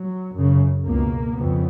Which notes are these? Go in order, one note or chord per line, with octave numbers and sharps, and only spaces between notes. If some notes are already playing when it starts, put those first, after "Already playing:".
Already playing: F#3
F#2 C#3
C#2 B2 A#3
F2 C#3 B3